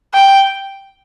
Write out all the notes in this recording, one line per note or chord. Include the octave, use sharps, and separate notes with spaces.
G5